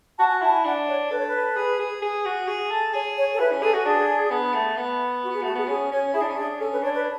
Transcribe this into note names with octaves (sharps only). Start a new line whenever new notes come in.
F#4 A5
G#5
E4 A5
G#5
D4 F#5
C#5
A4 B4
C#5
B4
G#4
G#4
G#4
F#4
G#4
A4
G#4 C#5
C#5
A4
E4 B4
C#4
G#4 A4
F#4
D4 G#4
B3
A3
B3
F#4
G#4
A3 F#4
B3 G#4
C#4 G#4
C#4 C#5
E4 G#4
D4
C#4
D4 G#4
C#4 A4
B4
D4 C#5
B4